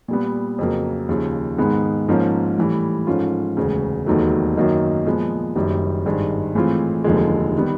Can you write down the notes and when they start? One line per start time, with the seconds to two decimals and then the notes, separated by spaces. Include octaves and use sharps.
0.08 A#2 G3 B3
0.58 F2 C#3 F#3 A#3
1.09 D#2 C#3 F3
1.58 G#2 D#3 G#3 B3
2.08 G#2 F3 A#3 C#4
2.58 A2 E3 G3
3.07 G#2 F3 A3 C#4 F4
3.57 E1 D2 C#3
4.06 E1 D#2 D#3 F#3 A3
4.56 F#2 D#3 F#3 A#3 D#4
5.06 A#2 F3 G#3 B3
5.55 F#1 F#2 D#3 G3
6.05 G#1 G2 D#3 G#3
6.55 A2 E3 G#3 C4 F4
7.04 F1 D#2 D3 F3 G#3
7.57 D#3 G3 B3